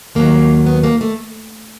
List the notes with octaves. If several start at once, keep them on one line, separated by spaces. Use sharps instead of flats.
D#2 D#3 F#3 A#3
B3
A#3
A3